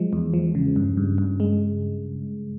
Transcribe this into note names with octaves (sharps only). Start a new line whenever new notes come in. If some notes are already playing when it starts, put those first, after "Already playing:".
Already playing: F3 G#3
E2
F3
C#3
G2
G2
G2
G#3